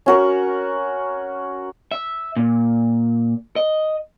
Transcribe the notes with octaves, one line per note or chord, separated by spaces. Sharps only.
C#4 F#4 A#4
E5
A#2
D#5